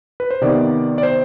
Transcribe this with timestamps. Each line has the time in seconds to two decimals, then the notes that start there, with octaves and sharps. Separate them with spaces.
0.20 B4
0.31 C5
0.41 C3 D#3 B3 D5
0.98 D5
1.03 C5